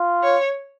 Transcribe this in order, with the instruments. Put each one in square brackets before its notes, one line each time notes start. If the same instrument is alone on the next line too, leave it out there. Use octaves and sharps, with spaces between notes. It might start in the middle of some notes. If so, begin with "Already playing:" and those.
Already playing: [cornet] F4
[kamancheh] C#5